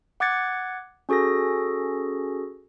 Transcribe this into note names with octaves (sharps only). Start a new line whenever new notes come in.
F#5 D6 F#6 G#6 A6 C#7
C#4 F#4 G#4 A4 A#6